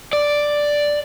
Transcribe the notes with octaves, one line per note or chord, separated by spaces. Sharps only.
D5